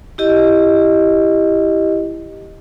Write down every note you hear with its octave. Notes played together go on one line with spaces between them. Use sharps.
E4 G4 D#5